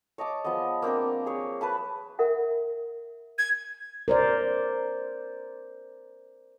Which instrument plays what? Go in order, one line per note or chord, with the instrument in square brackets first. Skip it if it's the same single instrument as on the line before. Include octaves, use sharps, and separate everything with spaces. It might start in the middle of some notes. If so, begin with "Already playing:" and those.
[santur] C#5 D#5 A5 D6
F3 G#3 B3 D#5
A#3 C4 D4 A#4
G#4 C#5
B4 A5 B5
[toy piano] A#4 E5 F#5
[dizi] G#6
[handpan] A#4 C5 D5